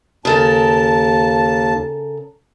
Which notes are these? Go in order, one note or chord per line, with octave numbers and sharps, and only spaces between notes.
D#2 C#3 A4 A#4 A5